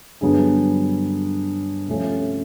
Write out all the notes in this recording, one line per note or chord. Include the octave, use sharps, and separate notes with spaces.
G2 D3 F#3 B3 G#4
C3 F3 A3 C#4